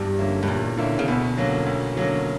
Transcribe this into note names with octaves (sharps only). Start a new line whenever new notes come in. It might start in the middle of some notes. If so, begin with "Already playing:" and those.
Already playing: E2 G2
D3 A#3 C#4 E4
G2
E2 A#2
D3 A#3 C#4 E4
C#3
D2 B2
D3 F#3 A#3 C#4
D2
D3 F#3 A#3 C#4